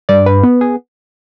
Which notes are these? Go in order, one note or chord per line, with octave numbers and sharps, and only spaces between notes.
G2 D5
B4
B3
G#4